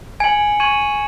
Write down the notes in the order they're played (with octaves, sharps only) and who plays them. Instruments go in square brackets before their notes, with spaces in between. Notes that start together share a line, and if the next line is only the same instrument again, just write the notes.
[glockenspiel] G#5 [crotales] G#6 C#7 F#7
[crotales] C#6 G#6 D#7 F#7